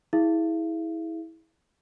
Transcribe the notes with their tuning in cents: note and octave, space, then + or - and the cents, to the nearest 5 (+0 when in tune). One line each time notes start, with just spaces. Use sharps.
E4 -25 G#4 +5 F5 -40